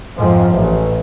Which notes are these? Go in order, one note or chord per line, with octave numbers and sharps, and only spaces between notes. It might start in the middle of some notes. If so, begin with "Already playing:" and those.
F2 G#2 F3
A1